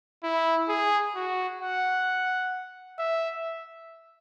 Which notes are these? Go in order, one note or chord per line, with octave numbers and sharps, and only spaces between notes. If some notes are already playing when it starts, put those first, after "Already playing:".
E4
G#4
F#4
F#5
E5